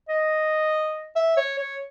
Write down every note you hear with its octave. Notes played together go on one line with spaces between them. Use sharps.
D#5
E5
C#5
C#5